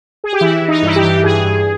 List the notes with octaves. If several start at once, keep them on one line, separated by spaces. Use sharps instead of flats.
G#4
G4
E3 E4
E3
D#4
G2 E4
G4
E3
G2 G#4
G2